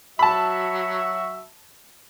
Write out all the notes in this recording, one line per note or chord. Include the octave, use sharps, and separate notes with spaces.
F#3 F#4 E5 A5 B5